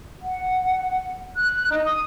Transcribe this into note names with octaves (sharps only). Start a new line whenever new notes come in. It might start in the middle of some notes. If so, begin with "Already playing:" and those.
F#5
F#6
D#4
D#6